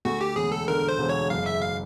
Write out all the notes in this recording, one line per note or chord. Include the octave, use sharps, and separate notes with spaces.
D2 F#4
G4
E1 G#4
A4
D3 A#4
C5
E1
C#5
F#1 F5
E5
F5